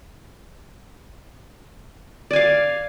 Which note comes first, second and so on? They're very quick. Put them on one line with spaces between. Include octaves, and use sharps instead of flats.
D5 G#5 F5